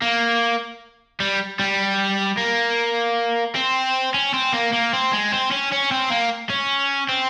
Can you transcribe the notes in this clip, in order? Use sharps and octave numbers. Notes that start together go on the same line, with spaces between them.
A#3
G3
G3
A#3
C4
C#4
C4
A#3
A#3
C4
G#3
C4
C#4
C#4
C4
A#3
C#4
C4